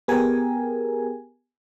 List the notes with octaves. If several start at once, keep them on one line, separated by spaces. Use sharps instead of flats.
B3 G4 G#4 A#4 G#5